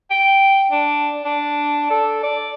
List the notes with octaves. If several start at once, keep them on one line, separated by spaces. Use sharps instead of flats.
G5
D4
D4
A4
D5